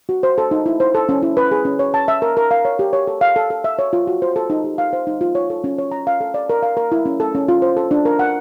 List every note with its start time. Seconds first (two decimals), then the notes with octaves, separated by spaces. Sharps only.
0.09 F#4
0.23 C5
0.38 A4
0.51 D#4
0.66 E4
0.80 C5
0.95 A4
1.09 C#4
1.22 E4
1.37 B4
1.51 G#4
1.65 C#4
1.79 C#5
1.94 A5
2.08 E5
2.22 A#4
2.37 A#4
2.51 F5
2.65 C#5
2.79 G4
2.93 C#5
3.07 A4
3.21 F5
3.36 A4
3.50 A4
3.64 E5
3.79 C#5
3.93 F4
4.07 F#4
4.22 C5
4.36 A4
4.50 D#4
4.64 G4
4.78 F5
4.93 C5
5.07 D#4
5.21 F4
5.35 C#5
5.50 A4
5.64 C#4
5.78 C#5
5.91 A#5
6.07 F5
6.21 A4
6.34 D5
6.50 A#4
6.63 F5
6.77 A#4
6.92 E4
7.06 C#4
7.20 A4
7.35 C#4
7.48 F4
7.62 C5
7.77 A4
7.91 D4
8.05 A#4
8.19 F#5